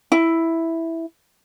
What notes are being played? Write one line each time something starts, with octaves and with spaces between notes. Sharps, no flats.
E4